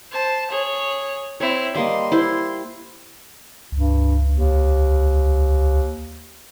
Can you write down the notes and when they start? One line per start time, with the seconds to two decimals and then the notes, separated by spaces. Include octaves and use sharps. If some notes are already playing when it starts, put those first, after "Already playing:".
0.11 C5 A5
0.50 G#4 C#5
1.40 C4 E4 C#5
1.75 G3 A#3 D#5 C6
2.12 E4 G4 C5
3.72 C#2 G2
4.31 D#2